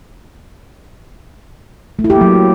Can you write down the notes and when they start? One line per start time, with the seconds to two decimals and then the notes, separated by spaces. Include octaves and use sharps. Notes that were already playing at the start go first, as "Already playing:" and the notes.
1.99 A3
2.04 E4
2.10 G4
2.15 A#3
2.21 F#3